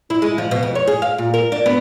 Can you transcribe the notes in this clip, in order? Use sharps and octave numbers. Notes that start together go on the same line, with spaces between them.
E4
G#3
F3
B2
F2
C#5
G#4
F5
A#2
A#4
D4
B3